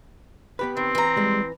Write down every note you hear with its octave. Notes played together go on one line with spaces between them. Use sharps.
B3 G4 B4
D#3 C4
E3 A#5
G3 G#3